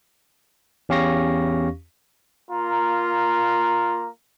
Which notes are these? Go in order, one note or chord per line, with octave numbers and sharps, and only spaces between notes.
E2 C#4 G4 F5 C#6 A#6
A#3 F4 A#5